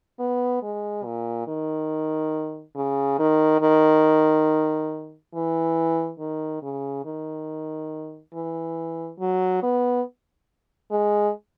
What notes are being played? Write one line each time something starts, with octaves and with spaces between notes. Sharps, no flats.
B3
G#3
A#2
D#3
C#3
D#3
D#3
E3
D#3
C#3
D#3
E3
F#3
B3
G#3